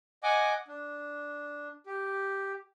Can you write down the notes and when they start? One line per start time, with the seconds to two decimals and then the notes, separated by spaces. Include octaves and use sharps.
0.23 D#5 F#5 G#5 D6
0.68 D4
1.86 G4